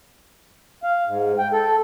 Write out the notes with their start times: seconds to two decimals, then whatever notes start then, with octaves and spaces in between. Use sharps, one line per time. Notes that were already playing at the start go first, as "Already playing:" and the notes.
0.83 F5
1.07 G#2
1.38 G5
1.53 A4